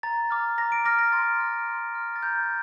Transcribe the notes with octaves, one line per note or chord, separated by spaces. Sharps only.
A#5 A6
D6 F6
A#5 A#6
D7
D6 F6 A#6
A#6
C6 A6
F6
C6
F6
A6
A#5 G6